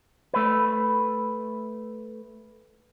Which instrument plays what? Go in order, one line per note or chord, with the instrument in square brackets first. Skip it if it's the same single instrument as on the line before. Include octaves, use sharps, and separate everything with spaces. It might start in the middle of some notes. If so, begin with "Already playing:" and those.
[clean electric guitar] A3 B4